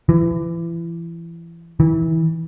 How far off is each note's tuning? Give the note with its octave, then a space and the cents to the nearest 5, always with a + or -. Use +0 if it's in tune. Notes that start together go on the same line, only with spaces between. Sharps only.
E3 +30
E3 -25